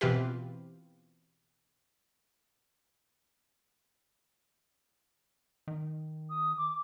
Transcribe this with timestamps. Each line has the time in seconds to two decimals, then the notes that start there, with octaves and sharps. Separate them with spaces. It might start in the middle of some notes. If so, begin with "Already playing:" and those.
0.01 B2 E3 C4 F4 G4 B4
5.68 D#3
6.30 D#6
6.58 D6